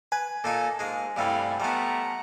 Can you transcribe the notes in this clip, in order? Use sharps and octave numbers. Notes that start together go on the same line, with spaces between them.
B4 G#5
A#2 A#3 D#4 A4
G#2 G#3 A#3
G2 C3 G3 A3 E4 F5
G3 A3 B3 F#5 A#5